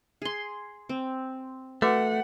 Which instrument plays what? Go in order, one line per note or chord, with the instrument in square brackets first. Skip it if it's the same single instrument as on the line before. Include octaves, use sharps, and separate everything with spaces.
[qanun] G#4 C6
C4
[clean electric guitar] A3 [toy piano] F#4 B4 D6 [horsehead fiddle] F#5